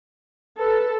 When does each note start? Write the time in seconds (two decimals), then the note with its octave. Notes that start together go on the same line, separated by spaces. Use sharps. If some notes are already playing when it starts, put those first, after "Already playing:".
0.60 A4 B4